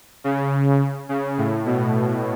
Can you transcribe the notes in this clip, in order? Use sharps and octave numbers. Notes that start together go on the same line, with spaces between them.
C#3
C#3
A2
B2